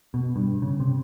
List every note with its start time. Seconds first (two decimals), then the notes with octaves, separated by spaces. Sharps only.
0.14 B2
0.36 G2
0.62 C#3
0.80 C3